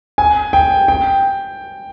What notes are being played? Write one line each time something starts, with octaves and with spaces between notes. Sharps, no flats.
G#5
G5
G5